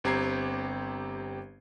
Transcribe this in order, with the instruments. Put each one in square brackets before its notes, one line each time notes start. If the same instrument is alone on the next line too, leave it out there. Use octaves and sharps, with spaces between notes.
[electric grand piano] G1 C4 G4 A#5 G#6 C7